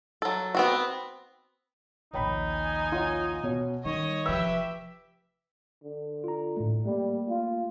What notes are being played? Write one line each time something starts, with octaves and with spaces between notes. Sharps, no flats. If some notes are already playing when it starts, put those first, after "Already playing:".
F#3 A4
B3 C4 F#4
A#1 D#2 D#4 C#5 G5 B5
G#5
F4 C#5 F#5
B2 C#5
D#3 G3 C#5 D#5
F1 F3 G4 B4 E5 E6
D3
F4 A#5
A2 A3
G3 A3 A#3
F4